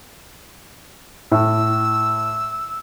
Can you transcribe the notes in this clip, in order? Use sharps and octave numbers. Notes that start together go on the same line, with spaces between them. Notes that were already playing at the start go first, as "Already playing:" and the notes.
A2 E6